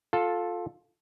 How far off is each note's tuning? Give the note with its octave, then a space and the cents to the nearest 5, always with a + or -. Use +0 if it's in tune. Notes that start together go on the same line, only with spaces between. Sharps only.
F4 +15 A4 +0